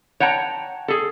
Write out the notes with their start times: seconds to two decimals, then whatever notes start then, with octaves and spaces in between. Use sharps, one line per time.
0.20 C#5 F#5 G5 A5 A#5
0.88 G#4 A4